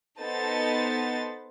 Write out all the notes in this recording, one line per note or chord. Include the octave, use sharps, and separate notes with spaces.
B3 D#4 A4 C5 A6